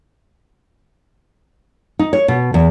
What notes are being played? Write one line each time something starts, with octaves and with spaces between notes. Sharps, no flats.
D#4
C#5
B2
E2